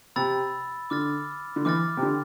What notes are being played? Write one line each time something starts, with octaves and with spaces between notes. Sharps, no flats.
C3 B5 E6 A6
D3 D6 F6 A6
D3
E3 D6 F6 A6
C3
D3